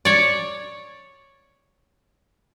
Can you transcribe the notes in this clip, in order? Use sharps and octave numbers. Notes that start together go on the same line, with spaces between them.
C#5 D5